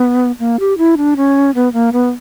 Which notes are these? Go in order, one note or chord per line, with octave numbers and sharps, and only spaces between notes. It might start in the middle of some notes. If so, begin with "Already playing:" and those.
Already playing: B3
A#3
G4
E4
D4
C#4
B3
A#3
B3